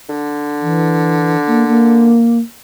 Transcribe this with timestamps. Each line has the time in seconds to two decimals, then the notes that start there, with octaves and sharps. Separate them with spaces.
0.09 D3
0.62 E3
1.47 A#3
1.68 A#3